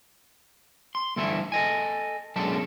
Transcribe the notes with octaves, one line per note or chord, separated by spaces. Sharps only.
C6
D2 G2 E3 E4 A4 E5
A4 D#5 G#5
B1 F#2 G#3 D4 A4 A5